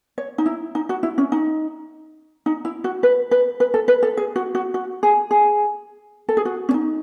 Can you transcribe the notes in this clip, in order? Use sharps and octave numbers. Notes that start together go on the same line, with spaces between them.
C#5
D#4
E4
D#4
F#4
E4
C#4
D#4
D#4
E4
F#4
B4
B4
B4
A4
B4
A4
G#4
F#4
F#4
F#4
G#4
G#4
A4
G#4
F#4
C#4
D#4